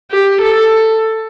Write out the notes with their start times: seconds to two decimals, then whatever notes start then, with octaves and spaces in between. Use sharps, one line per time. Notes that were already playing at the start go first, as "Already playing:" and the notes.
0.11 G4
0.42 A4